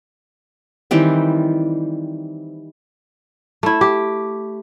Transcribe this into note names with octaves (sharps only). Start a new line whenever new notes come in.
D#3 E3 G3 C4
A3 E4
G4